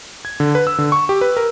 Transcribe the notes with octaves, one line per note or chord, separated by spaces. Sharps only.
G#6
D3
B4
E6
D3
C#6
G4
B4
A#4